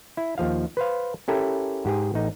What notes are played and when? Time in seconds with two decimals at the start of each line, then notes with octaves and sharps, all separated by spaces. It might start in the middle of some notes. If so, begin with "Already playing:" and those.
0.17 E4
0.38 D#2 F3 F5
0.77 B4 C5 F5
1.28 C#4 E4 G4 A4 A#4
1.85 G#2 G4 G#4
2.14 A1 D#4